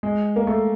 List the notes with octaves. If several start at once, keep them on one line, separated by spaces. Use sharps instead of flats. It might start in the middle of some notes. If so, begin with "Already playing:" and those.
G#3
A#3
A3